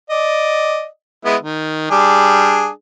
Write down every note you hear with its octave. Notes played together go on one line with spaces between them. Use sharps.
D5 D#5
G#3 B3 E4
D#3
G3 D4 G#4